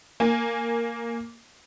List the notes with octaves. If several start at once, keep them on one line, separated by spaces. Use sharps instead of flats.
A#3 G#5